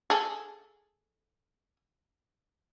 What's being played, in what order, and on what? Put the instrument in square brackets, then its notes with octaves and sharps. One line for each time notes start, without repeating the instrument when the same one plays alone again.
[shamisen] G#4 A4